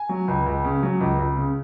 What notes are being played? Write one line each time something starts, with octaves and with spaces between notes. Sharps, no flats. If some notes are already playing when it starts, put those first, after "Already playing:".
Already playing: G#5
F#3
C#2
C#2
C#3
F#3
C#2
C#2
C#3